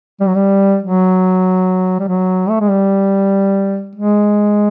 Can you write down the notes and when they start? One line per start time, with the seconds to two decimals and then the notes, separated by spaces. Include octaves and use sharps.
0.20 G3
0.28 F#3
0.35 G3
0.83 F#3
2.00 G3
2.08 F#3
2.49 A3
2.60 G#3
2.70 G3
3.95 G#3